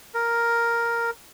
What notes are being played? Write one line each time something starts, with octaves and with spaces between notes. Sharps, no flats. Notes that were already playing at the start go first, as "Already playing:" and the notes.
A#4